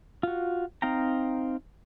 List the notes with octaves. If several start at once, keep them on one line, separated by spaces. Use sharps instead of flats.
F4 F#4
C4 D#4 F5 G5 A#5